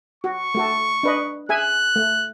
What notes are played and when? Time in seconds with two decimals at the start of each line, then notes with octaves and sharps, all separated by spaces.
0.24 F#4 C#6
0.55 A3 F#4 A4
1.03 D4 B4 D#5
1.49 G#4 E5 G#5 F#6
1.96 A3